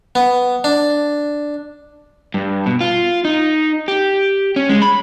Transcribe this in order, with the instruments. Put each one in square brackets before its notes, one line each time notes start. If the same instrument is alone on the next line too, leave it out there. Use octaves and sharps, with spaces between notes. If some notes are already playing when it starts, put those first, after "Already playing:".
[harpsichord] B3
D4
[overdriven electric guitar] G2
B2
F4
D#4
G4
C#4
G#3
B5